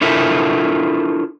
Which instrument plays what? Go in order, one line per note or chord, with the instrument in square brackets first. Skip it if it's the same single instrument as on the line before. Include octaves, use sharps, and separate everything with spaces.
[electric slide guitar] D4 E4 F4 A4 A#4 E5